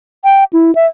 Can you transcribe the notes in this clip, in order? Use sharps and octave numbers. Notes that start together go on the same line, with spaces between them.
G5
E4
E5